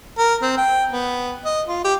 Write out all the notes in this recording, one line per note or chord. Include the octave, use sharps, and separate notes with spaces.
A#4
C4
G5
B3
D#5
F4
G4